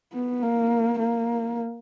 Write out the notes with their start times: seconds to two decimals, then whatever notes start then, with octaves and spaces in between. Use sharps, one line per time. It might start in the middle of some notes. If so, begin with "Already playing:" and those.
0.13 B3
0.42 A#3
0.99 A#3